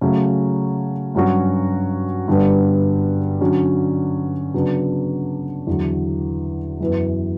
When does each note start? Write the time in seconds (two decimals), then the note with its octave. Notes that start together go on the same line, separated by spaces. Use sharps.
0.01 C#3 F#3 A3 C#4
1.14 G2 F#3 C#4 F#4
2.28 G2 D3 G3 B3
3.41 D3 F#3 C#4 F#4
4.54 C#3 F#3 B3 D4
5.67 E2 D3 F#3
6.80 F#2 E3 B3